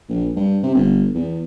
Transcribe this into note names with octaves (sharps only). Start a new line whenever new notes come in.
A#1
G2
C3
G1
E2